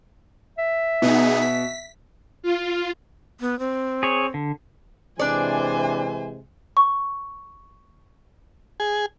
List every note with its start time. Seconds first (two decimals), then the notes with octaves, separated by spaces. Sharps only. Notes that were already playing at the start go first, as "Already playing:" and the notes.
0.58 E5
1.02 B2 B3 D#4 G#4
1.42 B6
2.43 F4
3.40 B3
3.59 C4
4.03 G#4 C#5
4.34 D3
5.20 C3 E3 G#3 D4 C5 D5 G#5
6.77 C#6
8.80 G#4